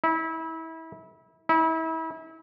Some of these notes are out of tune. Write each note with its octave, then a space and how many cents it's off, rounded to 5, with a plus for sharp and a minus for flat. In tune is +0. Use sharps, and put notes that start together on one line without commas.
E4 -30
E4 -35